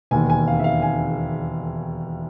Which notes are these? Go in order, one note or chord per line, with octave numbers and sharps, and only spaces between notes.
E1 D#2 D#3 G#5
G#5
F5
E5
F5
G#5